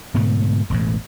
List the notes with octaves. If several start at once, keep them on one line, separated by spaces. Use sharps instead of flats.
G#2 B2 D3 A3
E1 A1 A2